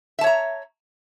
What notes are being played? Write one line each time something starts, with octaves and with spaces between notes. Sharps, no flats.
C#5 E5 A5 A#5